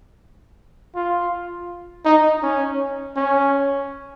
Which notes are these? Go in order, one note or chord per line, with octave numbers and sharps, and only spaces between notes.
F4
D#4
C#4
C#4